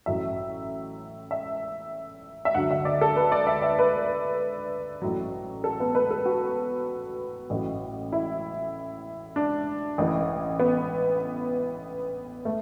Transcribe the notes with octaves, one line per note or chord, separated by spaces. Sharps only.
A1 A2 F#3 E5
E5
E5
D2 D3 F#3 F#5
E5
D5
A4
B4
D5
E5
E5
B4
A1 A2 F#3
A4
B3
B4
A4
F#4
A1 A2 F#3
E4
D4
A1 A2 E3
B3
A3